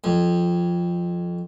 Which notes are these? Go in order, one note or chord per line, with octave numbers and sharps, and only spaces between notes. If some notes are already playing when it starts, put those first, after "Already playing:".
F2